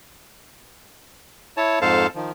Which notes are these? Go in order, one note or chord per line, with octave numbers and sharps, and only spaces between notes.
E4 C#5 A5
F2 G#2 A4 C5 F5 A5
D#3 F3